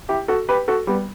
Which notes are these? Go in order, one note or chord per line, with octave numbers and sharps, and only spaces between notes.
E4 G4
F#4 A4
G4 B4
F#4 A4
G3 B3